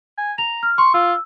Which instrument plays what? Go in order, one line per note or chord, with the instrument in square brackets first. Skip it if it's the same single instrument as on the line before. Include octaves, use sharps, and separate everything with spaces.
[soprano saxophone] G#5
[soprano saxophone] A#5 [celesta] F7
[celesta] F6
[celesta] C6 [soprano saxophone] C#6
[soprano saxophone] F4 [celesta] E6